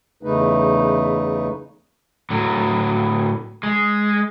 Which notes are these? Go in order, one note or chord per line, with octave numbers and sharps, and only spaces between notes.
E2 C#3 A3 D#4 B4
A2 D3 F#3
G#3